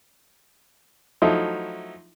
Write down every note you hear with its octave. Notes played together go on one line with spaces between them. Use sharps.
F3 F#3 A3 D#4 E4